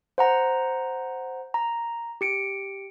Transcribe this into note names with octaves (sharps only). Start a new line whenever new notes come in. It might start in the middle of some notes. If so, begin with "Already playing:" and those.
C5 F#5 A#5
A#5
G4 C#7 D7